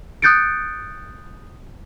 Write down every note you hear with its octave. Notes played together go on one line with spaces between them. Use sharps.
D#6 F#6 G6 A6 C#7 D7